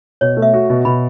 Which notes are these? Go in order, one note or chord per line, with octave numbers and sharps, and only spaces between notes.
B2 C#5
A3
E5
F#4
B2
B2 B5